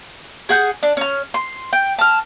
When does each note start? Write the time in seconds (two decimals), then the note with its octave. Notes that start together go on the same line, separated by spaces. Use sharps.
0.49 G#4 F#5 G6
0.83 D4
0.97 C#4 F6
1.34 C6
1.73 G5
1.99 A5 F6